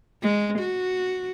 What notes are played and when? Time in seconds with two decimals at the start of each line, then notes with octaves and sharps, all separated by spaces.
0.22 G#3
0.59 F#4